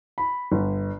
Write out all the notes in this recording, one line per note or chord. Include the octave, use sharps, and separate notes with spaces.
B5
G1